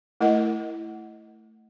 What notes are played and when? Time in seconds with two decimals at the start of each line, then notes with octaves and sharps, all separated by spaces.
0.21 A3 E4 A#4 D#5 F#5